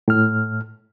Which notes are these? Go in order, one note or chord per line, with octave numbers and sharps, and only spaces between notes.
A2 F6